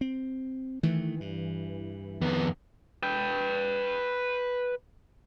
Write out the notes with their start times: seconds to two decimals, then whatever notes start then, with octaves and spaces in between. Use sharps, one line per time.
0.01 C4
0.83 D#3 E3 A3
1.20 G2
2.21 F2 D#3 B3
3.03 B4 G5